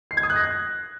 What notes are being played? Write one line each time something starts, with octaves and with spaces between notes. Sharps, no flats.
C7
G#6
D#6
F#6
A#6